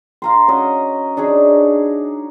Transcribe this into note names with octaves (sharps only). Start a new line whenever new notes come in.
F5 A#5 C6
C#4 F#4 D#5
D4 D#4 G#4 C#5